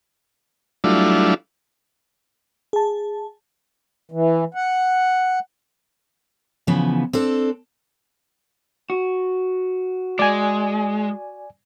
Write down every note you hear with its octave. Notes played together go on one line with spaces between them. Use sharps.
F#3 G3 A3 D4 E4 F4
G#4 A5
E3
F#5
C#3 E3 F3 B3
C4 D4 A4
F#4
G#3 D5 G#5